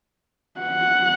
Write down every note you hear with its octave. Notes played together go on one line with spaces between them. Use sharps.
F#5